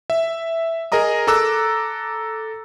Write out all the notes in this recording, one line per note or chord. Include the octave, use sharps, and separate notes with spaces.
E5
G#4 A#4 D#5 A#5 D#6
A4 A#5 D6 E6 F#6